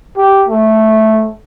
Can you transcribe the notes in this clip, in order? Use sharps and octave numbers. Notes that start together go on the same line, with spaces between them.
G4
A3